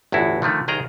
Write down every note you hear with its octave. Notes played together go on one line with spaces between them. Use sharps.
G1 E2 A2 E4 F#4
D3 D#3 F3 A3
C2 D#3 G#4 G5 A#5